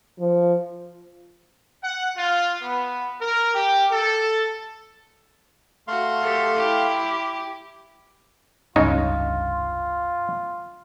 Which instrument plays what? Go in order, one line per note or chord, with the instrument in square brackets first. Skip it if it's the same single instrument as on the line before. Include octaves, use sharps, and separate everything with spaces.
[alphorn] F3
[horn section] F#5
F4
B3
A#4
G4
A4
[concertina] A3 F5 C6 [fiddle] F#4
[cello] G4 A4
[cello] E4 [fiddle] G4
[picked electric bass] F1 C#2 G2 [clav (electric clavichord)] C#3 G#3 D#4 [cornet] F4